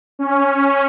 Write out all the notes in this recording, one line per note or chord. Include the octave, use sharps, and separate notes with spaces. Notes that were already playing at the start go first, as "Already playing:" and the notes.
C#4